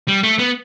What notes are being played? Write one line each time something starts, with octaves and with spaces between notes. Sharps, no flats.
G3
A3
B3